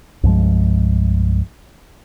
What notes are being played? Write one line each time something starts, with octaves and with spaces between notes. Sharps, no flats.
C2 G2 F3 G#3